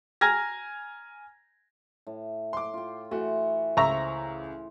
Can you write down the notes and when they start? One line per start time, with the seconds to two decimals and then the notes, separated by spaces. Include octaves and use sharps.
0.21 G#5 A#5 F6 G#6 A#6
2.07 A2
2.53 C6 D6
2.74 F4 G5
3.11 E3 A3 F#4
3.77 C#2 C5 E5 A#5 C#6